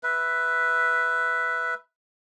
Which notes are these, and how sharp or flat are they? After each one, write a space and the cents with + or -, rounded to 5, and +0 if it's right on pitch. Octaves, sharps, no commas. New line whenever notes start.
B4 +0 E5 +0